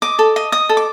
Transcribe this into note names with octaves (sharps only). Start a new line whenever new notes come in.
D#5 D6
A4
D#5
D#5 D#6
A4
D6